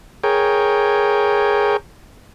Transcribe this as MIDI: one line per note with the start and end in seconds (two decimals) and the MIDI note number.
0.23 1.77 68
0.23 1.77 70
0.23 1.77 73
0.23 1.77 79